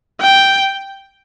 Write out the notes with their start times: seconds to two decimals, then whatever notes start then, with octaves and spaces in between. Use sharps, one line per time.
0.21 G5